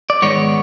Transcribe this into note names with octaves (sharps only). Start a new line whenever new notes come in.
D5
G#2 D#3 G#3 B3 C#5